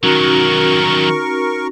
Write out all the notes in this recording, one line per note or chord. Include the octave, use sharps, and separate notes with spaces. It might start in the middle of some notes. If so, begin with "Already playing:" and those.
D#3 F#3 C#4 D#4 F#4 A#4 C#6